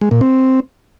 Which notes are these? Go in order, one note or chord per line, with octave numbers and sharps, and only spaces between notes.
G#3
A#2
C4